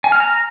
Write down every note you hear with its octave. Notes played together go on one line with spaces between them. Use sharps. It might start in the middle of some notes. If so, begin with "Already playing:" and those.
G#5
F6
A#5